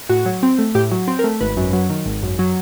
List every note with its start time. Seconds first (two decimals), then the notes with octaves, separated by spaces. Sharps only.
0.09 A2 F#4
0.26 F#3
0.43 C4
0.59 A3
0.75 A2 G4
0.91 F#3
1.08 C4
1.19 A#4
1.24 A3
1.41 G#1 B4
1.57 F#2
1.73 F#3
1.90 D#3
2.06 G#1
2.23 F#2
2.39 F#3